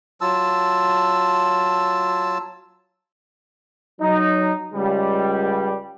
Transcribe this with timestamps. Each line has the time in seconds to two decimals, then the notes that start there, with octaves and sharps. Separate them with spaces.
0.21 F#3 F4 A5 E6
4.01 F#3 D#4
4.73 C#2 G3